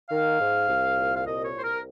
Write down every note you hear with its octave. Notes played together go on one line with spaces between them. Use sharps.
D#3 F5
G#2
C2
A#2
F5
C2 D#5
C#5
C2 C5
A#4